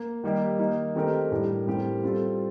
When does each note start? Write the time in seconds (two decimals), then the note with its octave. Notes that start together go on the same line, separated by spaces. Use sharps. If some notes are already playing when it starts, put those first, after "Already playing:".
Already playing: A#3
0.24 D#3 G3 A#3 D#4 G4
0.59 D#3 A#3 D#4
0.96 D#3 A3 C4 G4 A#4
1.31 A2 G3 D4 G4 A#4
1.67 A2 G3 C4 G4 A#4
2.03 G3 C4 F4 A4